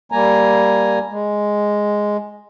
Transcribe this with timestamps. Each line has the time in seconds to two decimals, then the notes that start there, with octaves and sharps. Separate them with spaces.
0.12 G3 A#3 G#5 A#5
1.10 G#3